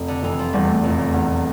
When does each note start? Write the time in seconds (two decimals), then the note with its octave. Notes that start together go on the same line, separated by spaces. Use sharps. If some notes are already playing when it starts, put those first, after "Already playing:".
Already playing: F1
0.08 D3
0.23 F1 E3
0.39 F3
0.53 E2 G3
0.68 A3
0.83 F1 A#2
0.99 C#3
1.13 E2 D3